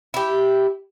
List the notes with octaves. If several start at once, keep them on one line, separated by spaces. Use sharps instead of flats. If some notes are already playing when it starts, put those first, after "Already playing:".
E4 G4